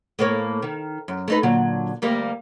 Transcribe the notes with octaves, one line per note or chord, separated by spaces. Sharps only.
A2 A#3 C#5
D#3
F#2
A3 D#4 B4
A#2 D3 F#3
D2 G3 A#3